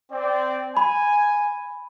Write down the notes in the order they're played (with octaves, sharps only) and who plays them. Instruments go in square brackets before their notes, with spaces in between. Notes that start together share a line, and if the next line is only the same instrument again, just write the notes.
[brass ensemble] C4 D5
[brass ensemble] G#5 [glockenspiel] B5